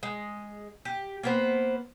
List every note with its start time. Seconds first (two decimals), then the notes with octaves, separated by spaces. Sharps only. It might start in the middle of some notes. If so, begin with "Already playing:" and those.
0.03 G#3
0.85 G4
1.23 A#3 B3 C5